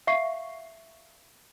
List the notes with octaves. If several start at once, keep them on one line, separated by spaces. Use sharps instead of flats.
E5 F5 C#6 C7